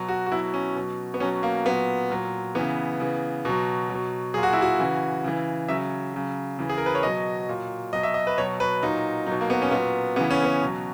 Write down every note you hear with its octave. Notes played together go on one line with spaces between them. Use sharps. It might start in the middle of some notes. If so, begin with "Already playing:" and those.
Already playing: B2 F#3
F#4
F#4
B2 F#3 E4
C#4
B2 F#3
B3
B2 F#3 C#4
A#3
A#2 F#3 B3
A#2 F#3
C#3 E3 B3
C#3 E3
B2 F#3
F#3
B2
A#2 F#3 G#4
F#4
E4
F#4
C#3 E3
C#3 E3
C#3 F#3 E5
C#3 F#3
C#3 E3
G#4
A#4
B4
C#5
B2 F#3 D#5
A#2 F#3
B2 F#3 D#5
E5
D#5
B4
B2 F#3 C#5
B4
A#2 F#3 D#4
B2 F#3 D#4
A#3
B3
C#4
A#2 F#3 B3
C#3 E3 B3
C#4
B3
B2 F#3